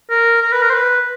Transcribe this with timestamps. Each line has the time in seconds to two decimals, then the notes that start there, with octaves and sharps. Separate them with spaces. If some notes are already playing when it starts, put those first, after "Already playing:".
0.10 A#4
0.42 A#4
0.52 B4
0.62 A#4
0.70 C5
0.74 B4